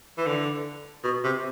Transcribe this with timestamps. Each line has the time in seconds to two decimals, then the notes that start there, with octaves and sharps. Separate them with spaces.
0.18 E3
0.26 D3
1.04 B2
1.24 C3